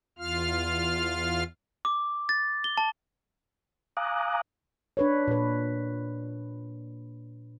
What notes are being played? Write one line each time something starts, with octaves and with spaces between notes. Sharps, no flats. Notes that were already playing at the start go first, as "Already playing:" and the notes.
E2 F4 F5 F6
D6
A6
G7
A5
F5 G#5 A#5 D6 D#6 F#6
D4 B4 C#5
A#2 B4